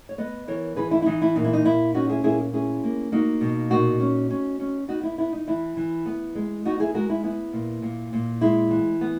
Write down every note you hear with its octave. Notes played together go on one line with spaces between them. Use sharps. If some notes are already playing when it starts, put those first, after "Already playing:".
C#5
B3 B4 D#5
E3 A#4 C#5
E3 G#4 B4
E4
E4
E3 D#4
E4
A#2 D#4
E4
D#4
A#2 E4
C#4 D#4 F#4
E4 G#4
A#2 E4 G#4
C#4 E4 G#4
A#3
A#3 D#4 F#4
B2
A#2 D#4 F#4
C#4
C#4
C#4
B3 D#4 F#4
E4
B3 E4
D#4
E3 E4
E3
B3
G#3
B3 D#4 F#4
E4 G#4
G#3 F#4 A#4
E4
B3 E4
A#2
A#2
A#2
G#3 E4
E3
B3